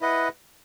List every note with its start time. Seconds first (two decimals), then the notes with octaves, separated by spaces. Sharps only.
0.01 E4 B4 D#5 F#5